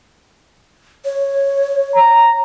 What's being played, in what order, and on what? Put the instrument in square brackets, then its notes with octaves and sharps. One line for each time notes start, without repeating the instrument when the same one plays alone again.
[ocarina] C#5
[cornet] A#5